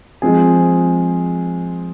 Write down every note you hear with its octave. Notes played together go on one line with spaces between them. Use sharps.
F3 G#3 C4 G#4